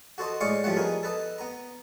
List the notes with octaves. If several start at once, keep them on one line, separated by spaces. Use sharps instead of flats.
F#4 A4 C5 D#5
A2 G#3 D5 D#5 F5 C#6
A2 F3 G3 A3 F#5
B3 D#4 G#4 A#4
A4 B4 D#5
B3 A#5